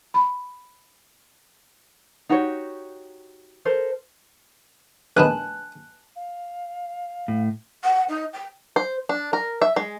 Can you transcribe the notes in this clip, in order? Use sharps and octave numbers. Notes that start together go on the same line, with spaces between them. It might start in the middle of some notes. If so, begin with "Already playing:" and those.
B5
D#4 F#4 G4 C#5
A4 A#4 C5
A#1 D#3 B3 G#5 A5 F#6
F5
A2
F#5
D#4
G5
C5
D4
A#4
E5
G#3